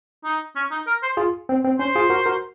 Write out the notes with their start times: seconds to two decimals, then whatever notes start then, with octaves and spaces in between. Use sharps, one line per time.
0.25 D#4
0.56 C#4
0.71 D#4
0.87 A#4
1.03 C5
1.17 F4 G#4
1.49 C4
1.64 C4
1.79 C#4 C5
1.96 F4 G#4
2.10 F#4 A#4
2.26 F#4 A#4